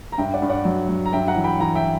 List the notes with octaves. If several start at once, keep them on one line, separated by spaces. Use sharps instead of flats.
A#5
G2 E5 G5
D5 F#5
G2
D5 F#5
F#3
F#3
A#5
G2 E5 G5
F#5 A#5
E3
G5 B5
E3 F#5 A#5
E5 G5